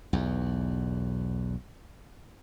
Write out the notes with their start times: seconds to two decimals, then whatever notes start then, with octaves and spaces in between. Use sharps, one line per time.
0.13 B1 E2